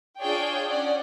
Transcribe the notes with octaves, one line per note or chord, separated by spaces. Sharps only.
D4 F4 G#4 C#5 D5 G5
C#4 D5 F#5